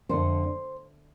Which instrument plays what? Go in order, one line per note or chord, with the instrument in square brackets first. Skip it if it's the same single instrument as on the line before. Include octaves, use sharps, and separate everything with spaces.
[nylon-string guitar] F2 D3 A3 C5